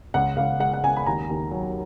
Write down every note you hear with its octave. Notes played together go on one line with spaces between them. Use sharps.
C#2 F#5
C#2 F5
G#3 F#5
F#5
C#3 G#5
B5
D#2 A#5
D#2
F#3